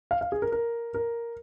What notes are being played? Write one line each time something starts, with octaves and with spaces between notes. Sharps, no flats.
F5
F5
G#4
A#4
A#4
A#4